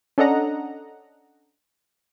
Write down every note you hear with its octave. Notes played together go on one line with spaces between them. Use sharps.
C#4 D4 A4 D#5 F#5 A#5